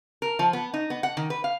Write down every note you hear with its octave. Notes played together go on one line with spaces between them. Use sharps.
A#4
F3
B3
D#4
B3
F#5
D#3
B4
F5